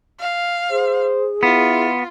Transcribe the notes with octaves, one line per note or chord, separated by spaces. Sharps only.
F5
G#4 C5
B3 E4 F4